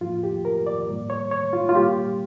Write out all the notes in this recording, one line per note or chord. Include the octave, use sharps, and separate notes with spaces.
A2 F3 A#3 F4
G4
A#4
D5
A2 G3 A#3
C#5
C#5
F4
F4
A#2 G3 A#3 G4